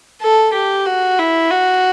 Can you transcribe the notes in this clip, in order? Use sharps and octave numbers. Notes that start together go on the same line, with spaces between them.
A4
G4
F#4
E4
F#4